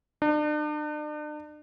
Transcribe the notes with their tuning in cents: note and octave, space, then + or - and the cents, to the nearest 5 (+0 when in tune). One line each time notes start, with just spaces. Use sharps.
D4 +40